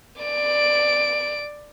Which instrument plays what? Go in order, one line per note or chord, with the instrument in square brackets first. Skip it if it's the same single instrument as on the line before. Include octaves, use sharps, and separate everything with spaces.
[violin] D5 D7